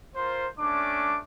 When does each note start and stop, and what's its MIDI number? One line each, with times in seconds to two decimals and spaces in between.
0.15 0.47 65
0.15 0.47 70
0.15 0.47 72
0.59 1.19 57
0.59 1.19 61
0.59 1.19 62
0.59 1.19 86